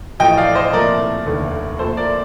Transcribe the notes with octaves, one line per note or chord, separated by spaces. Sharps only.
A1 A2 F3 A3 D#5 G5
D5 F5
C5 D#5
C2 A#2 F3 A3 A#4 D5
F1 D#2 D3 A3
A#1 A#2 A3 A4 C5
A#4 D5